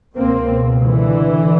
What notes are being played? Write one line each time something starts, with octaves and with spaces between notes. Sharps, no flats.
C#2 B2 A#3 C4
D3 E3